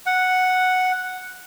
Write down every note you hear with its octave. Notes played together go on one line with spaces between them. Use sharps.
F#5